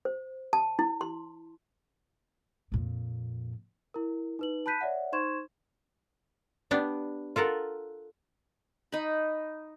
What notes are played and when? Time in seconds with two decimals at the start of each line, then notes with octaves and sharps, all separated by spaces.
0.05 C5
0.53 A5
0.79 E4
1.01 C6
2.72 F2 A#2
3.94 E4 A#4
4.39 D#4 B4 F#7
4.66 A5 B5 F#6 G6 B6 D#7
4.81 C#5 D5 E5 F#5
5.12 D#4 C5 C6 C#6 G#6 E7
6.71 B3 D4 G4
7.36 F4 A4 A#4 F#5
8.92 D#4 B5